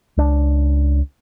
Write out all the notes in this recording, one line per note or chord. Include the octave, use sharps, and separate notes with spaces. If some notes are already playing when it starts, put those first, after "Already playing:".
C#2 D4